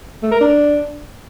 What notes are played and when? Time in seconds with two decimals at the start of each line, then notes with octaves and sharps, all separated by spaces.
0.22 A3
0.31 A#4
0.40 D4